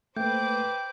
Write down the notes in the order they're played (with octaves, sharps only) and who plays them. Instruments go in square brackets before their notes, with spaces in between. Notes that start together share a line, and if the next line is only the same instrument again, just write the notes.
[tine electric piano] A3 A#3 [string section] B4 C5 D6 [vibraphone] G5 [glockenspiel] G6